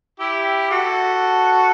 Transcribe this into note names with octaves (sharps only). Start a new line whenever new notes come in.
E4 G4
F#4 A4